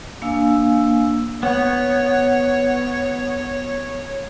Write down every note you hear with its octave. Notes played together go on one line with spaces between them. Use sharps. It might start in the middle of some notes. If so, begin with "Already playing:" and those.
A#3 D4 F5 G#5 E6
B3 C#5